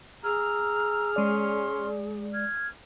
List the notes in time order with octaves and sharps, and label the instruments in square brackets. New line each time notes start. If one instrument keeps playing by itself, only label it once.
[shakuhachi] G#4 [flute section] A#5 E6 [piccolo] F6
[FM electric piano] G#3 D5 [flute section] C#4 C6
[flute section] F6 G#6